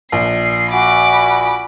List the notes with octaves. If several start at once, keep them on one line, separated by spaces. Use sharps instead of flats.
A#1 C7
F#4 G#5 B5 D6